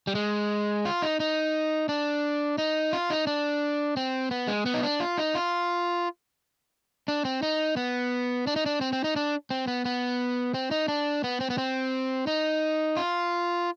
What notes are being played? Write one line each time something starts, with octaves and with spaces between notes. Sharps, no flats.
G3
G#3
F4
D#4
D#4
D4
D#4
F4
D#4
D4
C4
B3
G#3
B3
D#4
D4
F4
D#4
F4
D4
C4
D#4
B3
D4
D#4
D4
C4
C4
D#4
D4
C4
B3
B3
C4
D#4
D4
B3
C4
B3
C4
D#4
F4